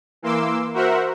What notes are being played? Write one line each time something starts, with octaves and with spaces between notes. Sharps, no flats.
E3 A#3 C6 D6 E6
F#4 A#4 C5 E5 F#5